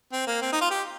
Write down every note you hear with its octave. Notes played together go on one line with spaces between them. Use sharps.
C4
A#3
C4
D#4
F4
G4